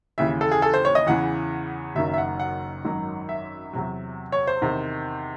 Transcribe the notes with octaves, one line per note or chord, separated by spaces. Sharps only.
D#2 C#3 E3 E5
A4
G#4
A4
C5
C#5
D#5
E2 C#3 E3 F#5
F#1 F#2 D#3 F#3 E5
E5
F#5
F#5
G#1 F#2 D#3 F#3
E5
E2 C3 F#3
C#5
C5
E2 C3 D#3